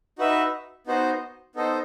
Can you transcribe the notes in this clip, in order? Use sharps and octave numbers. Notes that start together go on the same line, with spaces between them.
D#4 F#4 B4 E5
B3 D#4 F#4 C5 D#5
B3 D#4 A4 C5 D#5